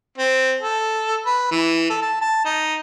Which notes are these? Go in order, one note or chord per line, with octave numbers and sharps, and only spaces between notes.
C4
A4
B4
E3
A4
A5
A5
D#4